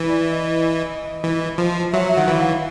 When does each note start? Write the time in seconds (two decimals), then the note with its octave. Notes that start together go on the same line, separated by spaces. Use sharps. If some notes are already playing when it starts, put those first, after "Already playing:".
Already playing: E3
0.08 D5
0.31 D#5
1.24 E3
1.58 F3
1.93 F#3 E5
2.16 D#3 F#5
2.28 E3
2.39 F5